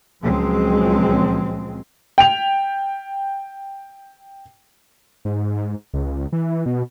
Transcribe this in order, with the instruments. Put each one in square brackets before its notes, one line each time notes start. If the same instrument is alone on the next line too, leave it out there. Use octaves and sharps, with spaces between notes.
[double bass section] C#2 A#2 F3 F#3 G#3 C4
[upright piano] G5 F7
[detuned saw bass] G#2
C#2
E3
B2